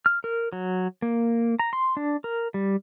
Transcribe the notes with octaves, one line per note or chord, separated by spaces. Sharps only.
F6
A#4
F#3
A#3
A#5
C6
D4
A#4
G3